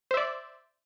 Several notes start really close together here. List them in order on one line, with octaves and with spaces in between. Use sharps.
C5 E5 D5